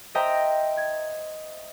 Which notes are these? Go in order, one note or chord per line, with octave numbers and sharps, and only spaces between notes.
C5 D#5 E5 G5 A#5
G#6